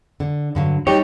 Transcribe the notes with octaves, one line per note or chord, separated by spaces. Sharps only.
D3
G2 D3 F#3
G3 D#4 G4 C#5